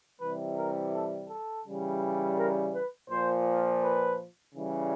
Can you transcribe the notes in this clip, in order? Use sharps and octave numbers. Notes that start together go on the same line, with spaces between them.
C3 E3 G3 B4
A#4
A4
A4
C#3 E3 G3
A#4
B4
A#2 F3 C5
B4
C#3 E3 G3